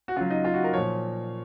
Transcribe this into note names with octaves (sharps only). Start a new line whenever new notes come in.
F#4
C#3 F#3 F4
D#4
F4
F#4
A#4
A#2 F3 C#5